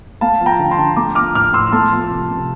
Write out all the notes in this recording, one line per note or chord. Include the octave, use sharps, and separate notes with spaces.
A3 F5 A5
F3
G5 A#5
D3
A5 C6
D3
A3 A#5 D6
F3 D6 F6
A2 D6 F6
A2 C6 E6
A3 A5 C6
F3
C3
C3